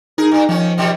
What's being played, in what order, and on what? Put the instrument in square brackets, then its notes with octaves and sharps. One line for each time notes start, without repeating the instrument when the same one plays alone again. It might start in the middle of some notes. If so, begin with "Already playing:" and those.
[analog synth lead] D#4 [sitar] G#4 A#4
[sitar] G2 A#3 [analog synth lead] D#4
[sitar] D#3 C#4 [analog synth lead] F3
[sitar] B2 D#3 G3